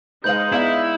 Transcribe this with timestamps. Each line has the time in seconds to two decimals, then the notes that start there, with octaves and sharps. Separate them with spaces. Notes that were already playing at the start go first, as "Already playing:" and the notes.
0.24 G#3 D#4 B4 C5 F5 G6 F#7
0.53 B3 E4 D5 F5